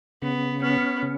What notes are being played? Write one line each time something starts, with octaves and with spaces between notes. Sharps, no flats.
C#3 B3
B3 C#4
C#3